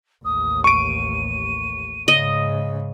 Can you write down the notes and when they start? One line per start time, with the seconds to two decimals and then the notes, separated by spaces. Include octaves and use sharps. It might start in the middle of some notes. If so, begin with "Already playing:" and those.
0.24 A1 D#2 D#6
0.64 C#6 D7 D#7
2.08 G#2 C#3 D#5